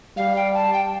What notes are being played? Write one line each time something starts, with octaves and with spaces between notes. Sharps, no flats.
G3 F5
G5
A5
G5